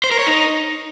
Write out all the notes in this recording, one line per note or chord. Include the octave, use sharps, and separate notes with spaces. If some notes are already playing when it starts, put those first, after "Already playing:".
C5
A#4
C#5
D#4